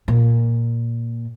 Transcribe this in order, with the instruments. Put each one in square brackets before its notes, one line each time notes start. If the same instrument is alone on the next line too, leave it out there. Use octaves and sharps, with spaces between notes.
[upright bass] A#2